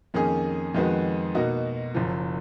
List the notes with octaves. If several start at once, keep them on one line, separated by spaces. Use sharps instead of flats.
F2 D#3 A#3 C#4 G#4
F2 D#3 G#3 B3 F#4
B2 A#3 D#4 F#4
F#1 F#2 F3